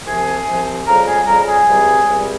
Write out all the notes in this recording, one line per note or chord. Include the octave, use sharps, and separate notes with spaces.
C2 C3 F3 G#4 G#5
C2 C3 F3
F2 C#3 G3 A#4 A#5
G#4 G#5
F2 C#3 G3 A#4 A#5
G#4 G#5
C#2 C3 G3
C#2 C3 G3